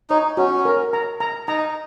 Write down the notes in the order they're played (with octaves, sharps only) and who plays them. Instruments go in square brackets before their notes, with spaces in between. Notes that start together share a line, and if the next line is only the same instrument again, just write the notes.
[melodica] D#4 [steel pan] C#5
[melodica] C#4 [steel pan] F#4
[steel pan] A#4
A#5
A#5
[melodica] D#4 [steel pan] A#5